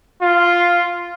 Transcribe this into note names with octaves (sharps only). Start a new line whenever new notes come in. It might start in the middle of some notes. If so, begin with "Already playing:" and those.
F4